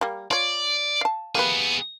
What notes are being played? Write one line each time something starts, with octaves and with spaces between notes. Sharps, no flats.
G3 A#3
F4 C#5 D5
F5 A5
A#3 B3 G4 G#4 B4